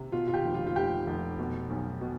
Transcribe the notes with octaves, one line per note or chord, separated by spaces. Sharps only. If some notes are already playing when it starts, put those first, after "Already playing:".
Already playing: C3
B2 F4
F4
G4
F1
F4
F4
F1 G4
F1
B2
B1
B2